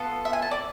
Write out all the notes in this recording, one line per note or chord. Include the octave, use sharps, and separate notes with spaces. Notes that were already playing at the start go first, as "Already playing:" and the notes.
Already playing: B3 F4 A4
E5
G#5
A5
D5